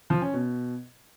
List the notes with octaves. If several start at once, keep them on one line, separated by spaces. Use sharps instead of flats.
F3
C#4
B2